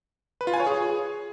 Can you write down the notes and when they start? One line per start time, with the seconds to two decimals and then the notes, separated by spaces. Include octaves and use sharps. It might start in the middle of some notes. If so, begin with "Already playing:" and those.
0.41 B4
0.47 F4
0.54 G#5
0.60 C#5
0.66 G#4